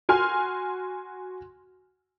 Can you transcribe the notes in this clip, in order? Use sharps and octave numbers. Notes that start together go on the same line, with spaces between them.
F#4 G#5 C6 F6